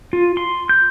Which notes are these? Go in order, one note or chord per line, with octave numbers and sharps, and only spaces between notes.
F4
C6
G6